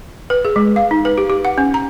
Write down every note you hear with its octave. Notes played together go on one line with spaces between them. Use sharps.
B4
G#4
G#3
F5
D#4
B4
G4
G4
F#5
C#4
A#5